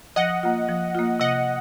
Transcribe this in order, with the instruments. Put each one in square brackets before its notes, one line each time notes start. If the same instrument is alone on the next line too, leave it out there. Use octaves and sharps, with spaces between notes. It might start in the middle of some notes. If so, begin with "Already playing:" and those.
[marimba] F3 [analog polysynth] D#5 F#5
[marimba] A#3 F4
F3
A#3 F4
[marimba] C3 [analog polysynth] D#5 F#5